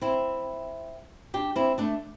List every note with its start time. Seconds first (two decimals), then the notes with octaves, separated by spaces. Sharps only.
0.01 C4 E4
1.34 D4 G4
1.56 C4 E4
1.78 A3 D4